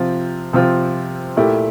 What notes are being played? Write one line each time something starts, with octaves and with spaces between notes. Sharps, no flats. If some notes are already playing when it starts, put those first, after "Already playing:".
Already playing: C3 F3 C4 F4
C3 F3 C4 F4
A#2 A3 E4 G4